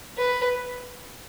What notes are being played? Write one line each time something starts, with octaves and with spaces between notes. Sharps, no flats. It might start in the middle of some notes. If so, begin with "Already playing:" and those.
B4